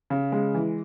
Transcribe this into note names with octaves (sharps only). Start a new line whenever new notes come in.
C#3
G#3
E3